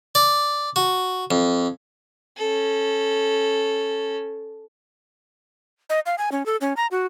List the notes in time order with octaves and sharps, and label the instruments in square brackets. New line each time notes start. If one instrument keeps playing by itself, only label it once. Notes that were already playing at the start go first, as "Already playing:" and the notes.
[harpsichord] D5
F#4
F2
[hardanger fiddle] C#4 A4
[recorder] D#5
F5
G#5
C#4
A4
C#4
A#5
F#4